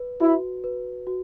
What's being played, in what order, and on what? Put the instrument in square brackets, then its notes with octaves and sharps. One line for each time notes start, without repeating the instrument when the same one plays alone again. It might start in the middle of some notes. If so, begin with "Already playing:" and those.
Already playing: [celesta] B4
[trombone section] E4 [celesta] F#4
[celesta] B4
F#4